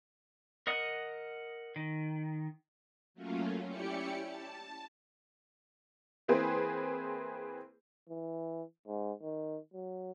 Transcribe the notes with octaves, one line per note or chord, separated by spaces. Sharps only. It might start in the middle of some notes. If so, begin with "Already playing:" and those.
A#4 D#5 F#5 D#6
D#3
F#3 A3 A#3 C#4 F4
C#4 E4 G4 D5 G5 C#7
A5
E3 A#3 C4 G#4 B4 C5
E3
G#2
D#3
F#3